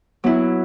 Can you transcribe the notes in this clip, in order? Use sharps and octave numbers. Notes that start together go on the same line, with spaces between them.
F#3 B3 E4